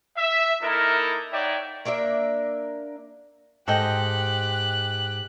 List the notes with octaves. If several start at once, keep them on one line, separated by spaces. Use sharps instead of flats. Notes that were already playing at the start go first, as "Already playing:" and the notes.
E5
A#3 D#4 E4 A4 A#4
D#4 C#5 D5 E5 F#5 G5
A#3 D4 A#4 E5
G#2 G4 A4 D#5 G5 F#6